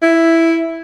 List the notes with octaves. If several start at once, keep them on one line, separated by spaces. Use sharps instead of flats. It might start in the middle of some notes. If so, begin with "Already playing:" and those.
E4